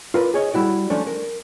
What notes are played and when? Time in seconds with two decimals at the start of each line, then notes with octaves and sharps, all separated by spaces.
0.14 F4 A#4 B4 D5
0.34 G#4 C#5 D#5
0.54 G3 E4 F#4 D5
0.90 F3 A3 C#4 D4
1.07 A#4